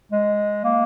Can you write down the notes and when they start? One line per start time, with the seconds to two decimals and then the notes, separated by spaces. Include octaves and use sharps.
0.12 G#3
0.64 A#3